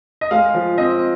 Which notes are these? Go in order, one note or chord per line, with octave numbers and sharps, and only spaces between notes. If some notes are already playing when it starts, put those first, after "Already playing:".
D#5
G#3 F5
F3
C4 D#5